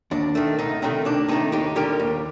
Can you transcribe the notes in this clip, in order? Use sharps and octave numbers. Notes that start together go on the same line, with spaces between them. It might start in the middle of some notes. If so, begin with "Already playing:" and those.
D#2 D4
D#3 A3
C2 D#4
C3 D#3 A3 D#4
C2 D4
C3 D#3 A3 D#4
D#2 D#4 G4
D3 G3 G4 A#4
D#2